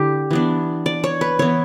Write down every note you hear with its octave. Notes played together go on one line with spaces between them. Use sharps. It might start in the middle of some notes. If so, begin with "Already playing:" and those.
Already playing: D3 E4 G4
E3 B3 D4
D5
C#5
B4
E3 B3 E4 C#5